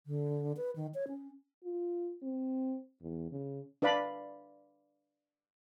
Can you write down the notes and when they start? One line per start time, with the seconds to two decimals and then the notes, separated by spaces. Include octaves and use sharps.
0.06 D3
0.57 B4
0.76 D#3
0.94 C#5
1.08 C#4
1.64 F4
2.22 C4
3.02 E2
3.32 C#3
3.82 D4 B4 D5 F5 B5